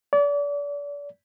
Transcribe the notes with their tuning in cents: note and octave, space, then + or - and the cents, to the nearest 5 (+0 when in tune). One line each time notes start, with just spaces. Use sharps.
D5 -35